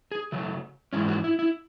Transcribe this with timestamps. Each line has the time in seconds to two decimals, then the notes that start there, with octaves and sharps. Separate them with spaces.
0.12 G#4
0.32 C#3 F#3 A3
0.93 G#2 E3 G#3 C#4 E4
1.08 F#4
1.24 E4
1.39 E4